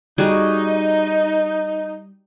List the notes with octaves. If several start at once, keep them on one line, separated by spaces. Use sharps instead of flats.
G3 D#4 F#4 G#4